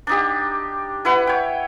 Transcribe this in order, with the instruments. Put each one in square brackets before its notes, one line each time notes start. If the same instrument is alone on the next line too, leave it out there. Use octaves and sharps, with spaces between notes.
[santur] D4 D#4 G4
E4 B4 F#5
C#5 G5